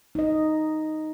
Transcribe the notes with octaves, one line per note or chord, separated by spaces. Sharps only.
D#4 D#5